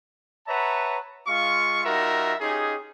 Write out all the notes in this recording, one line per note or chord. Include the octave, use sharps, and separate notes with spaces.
B4 C#5 E5 F#5 A5 A#5
G#3 F4 F5 C#6
G3 D#4 F4 F#4 A#4 E5
C#4 D#4 F4 G4 G#4